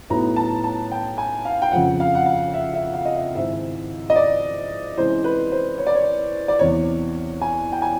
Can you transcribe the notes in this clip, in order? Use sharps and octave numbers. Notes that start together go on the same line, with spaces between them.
A2 F#3 B3 D#4 A#5
A5
A5
G5
G#5
F5
G5
F2 C#3 F3 F#5
F5
F#5
F5
E5
E5
F5
D#5
E5
G#2 D#3 G#3 C4 E4 E5
D#5
D5
C3 E3 G#3 C#4 E4 C5
B4
C5
C#5
D5
C#5
D5
E2 C3 E3 C#5
G#5
G5
G#5